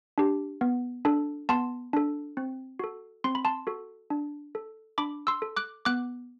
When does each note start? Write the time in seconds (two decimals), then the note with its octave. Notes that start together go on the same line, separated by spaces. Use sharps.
0.18 D4 G4
0.61 B3
1.05 D4 A4
1.49 B3 A5 C6
1.93 D4 A4
2.37 C4
2.79 F#4 A4
3.24 C4 C6
3.35 B5
3.45 A5 C6
3.67 F#4 A4
4.10 D4
4.55 A4
4.98 D4 B5 D6
5.27 C6 E6
5.42 A4
5.57 D6 F#6
5.85 B3 D6 F#6